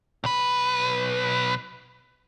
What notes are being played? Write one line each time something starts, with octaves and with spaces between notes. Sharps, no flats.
B1 B4